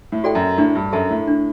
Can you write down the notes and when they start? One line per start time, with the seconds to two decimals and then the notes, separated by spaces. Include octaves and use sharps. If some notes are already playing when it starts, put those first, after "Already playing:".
0.12 A2
0.24 F#4 A4 D5 G5
0.35 F#2
0.58 A2 D4
0.75 G2
0.92 F#2 A4 E5 A5
1.11 A2
1.27 D4